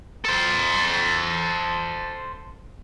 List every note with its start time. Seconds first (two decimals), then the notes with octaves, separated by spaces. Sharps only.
0.25 A4 C5